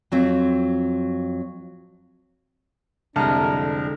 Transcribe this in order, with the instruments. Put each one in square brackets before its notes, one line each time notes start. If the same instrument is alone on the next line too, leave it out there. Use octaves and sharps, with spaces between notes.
[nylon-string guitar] F2 F#3 C4
[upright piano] C2 A5 F6 [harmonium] F2 D4 [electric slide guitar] D3 G#3 A#4